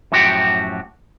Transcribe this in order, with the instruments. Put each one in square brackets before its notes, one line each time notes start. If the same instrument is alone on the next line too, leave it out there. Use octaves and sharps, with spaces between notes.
[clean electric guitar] F#2 A2 F3 F#4 G4 G5